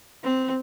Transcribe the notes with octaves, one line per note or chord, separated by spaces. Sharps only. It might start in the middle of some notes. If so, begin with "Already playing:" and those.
C4